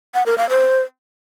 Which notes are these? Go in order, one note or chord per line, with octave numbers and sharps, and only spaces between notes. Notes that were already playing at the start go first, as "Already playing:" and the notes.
F#5
A#4
F5
C5